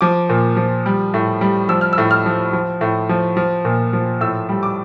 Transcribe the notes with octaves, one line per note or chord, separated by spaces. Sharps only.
F3 D6
A#2
F3
G3
A2
G3
F3 E6
F6
E6
A2
F6
F3
F3
A2
F3
F3
A#2
F3
A2 E6
G3
D6